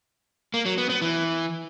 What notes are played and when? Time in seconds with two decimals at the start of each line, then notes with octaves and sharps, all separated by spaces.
0.54 A#3
0.66 F#3
0.78 B3
0.90 B3
1.02 E3